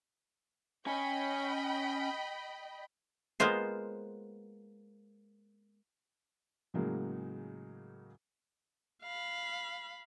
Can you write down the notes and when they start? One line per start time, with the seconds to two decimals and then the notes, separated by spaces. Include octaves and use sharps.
0.86 C#4 D#5 G5 G#5 B5
3.40 G#3 A#3 B3 F4 C5
6.74 A2 C#3 F#3 G#3 A#3
9.03 F5 B5